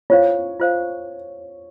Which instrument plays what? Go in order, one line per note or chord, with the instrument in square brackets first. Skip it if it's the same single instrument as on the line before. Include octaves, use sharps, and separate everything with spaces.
[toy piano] F4 C5 F5 [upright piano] C#5
[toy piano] F4 C5 F5